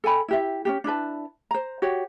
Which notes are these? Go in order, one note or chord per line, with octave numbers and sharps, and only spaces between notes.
A4 G5 G#5 B5
E4 G4 E5
C#4 D4 G4
D4 E4 B4 A5
C5 A#5
F#4 G4 C#5 F#5